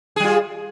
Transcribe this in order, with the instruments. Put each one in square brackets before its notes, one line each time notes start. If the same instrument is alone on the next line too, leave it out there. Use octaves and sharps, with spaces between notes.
[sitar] G#4
G3
F4